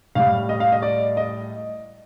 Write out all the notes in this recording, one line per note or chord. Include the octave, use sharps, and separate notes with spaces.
A2 G3 F5
D#5
F5
D#5
D5
D#5